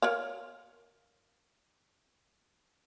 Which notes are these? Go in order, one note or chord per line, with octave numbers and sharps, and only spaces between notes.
A#4 C#5 F5